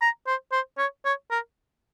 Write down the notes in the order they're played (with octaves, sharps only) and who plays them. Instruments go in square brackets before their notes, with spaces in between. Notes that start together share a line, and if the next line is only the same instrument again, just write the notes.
[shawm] A#5
C5
C5
C#5
C#5
A#4